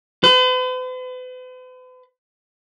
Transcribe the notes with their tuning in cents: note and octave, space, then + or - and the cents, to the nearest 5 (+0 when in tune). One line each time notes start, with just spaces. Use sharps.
B4 +45